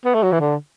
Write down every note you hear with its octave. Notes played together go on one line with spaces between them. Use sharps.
B3
A3
F#3
E3
D3